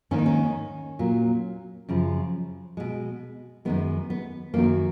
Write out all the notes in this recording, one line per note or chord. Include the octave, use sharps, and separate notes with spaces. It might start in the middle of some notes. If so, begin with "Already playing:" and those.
G#2 D#3 A#3 C#4
D#4
C#4
A#2 F#3 A#3
F#2 C#3 F3
B2 G#3
F#2 D#3 G#3 B3
B3
F#2 D#3 F#3 A#3